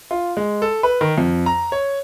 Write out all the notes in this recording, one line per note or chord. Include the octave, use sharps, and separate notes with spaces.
F4
G#3
A4
B4
D#3
F2
A#5
C#5